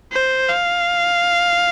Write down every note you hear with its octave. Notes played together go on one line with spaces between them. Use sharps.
C5
F5